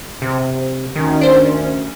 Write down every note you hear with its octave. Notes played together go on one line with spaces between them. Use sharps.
C3
D2 D#3 C#4
D4 C5